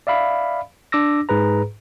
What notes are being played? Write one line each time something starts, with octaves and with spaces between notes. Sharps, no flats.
D5 E5 F5 B5
D4 D6 E6 A#6
G#2 G#4 B4 A#5